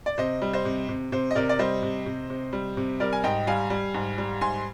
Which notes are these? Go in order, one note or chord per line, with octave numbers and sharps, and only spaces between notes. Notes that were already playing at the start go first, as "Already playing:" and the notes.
D5
C3 C5 D#5
G3
C5 D#5
C3
C3
C3 C5
D#5
C3 A#4 D5
D5
G3 C5 D#5
C3
C3
C3
G3
C3
G3 A#4 D5
G#5
G#2 D#5 G5
G3 F5 G#5
G3
G#2
G3
G#2 G#5 C6